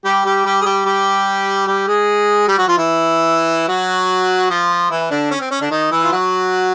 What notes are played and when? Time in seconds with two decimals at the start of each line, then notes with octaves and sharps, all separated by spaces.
0.05 G3 G4
0.25 G3 G4
0.45 G3 G4
0.61 G#4
0.65 G3 G4
0.86 G3 G4
1.67 G3 G4
1.87 G#3 G#4
2.48 G3 G4
2.58 F#3 F#4
2.67 F3 F4
2.78 E3 E4
3.69 F#3 F#4
4.50 F3 F4
4.90 E3 E4
5.11 D3 D4
5.31 C#4
5.41 C4
5.51 C#4
5.61 D3 D4
5.71 D#3 D#4
5.91 E3 E4
6.04 F4
6.12 F#3 F#4